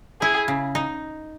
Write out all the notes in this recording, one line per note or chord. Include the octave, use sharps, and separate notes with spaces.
E4 G#4
C#3
D#4